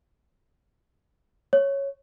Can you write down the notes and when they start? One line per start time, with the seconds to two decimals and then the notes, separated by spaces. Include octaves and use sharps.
1.53 C#5